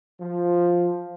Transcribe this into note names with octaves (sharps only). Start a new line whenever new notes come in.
F3